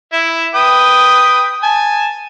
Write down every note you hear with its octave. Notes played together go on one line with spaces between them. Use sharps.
E4 E5
B4 G5 D#6
G#5 A5